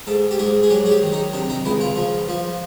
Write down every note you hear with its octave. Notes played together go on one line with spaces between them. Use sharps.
G#2 A4
G4
G#2 G#4
G#4
F#3 G4
G#4
G4
D#3
D#4
C3 D4
D#4
C#2 E4
F4
F3
F3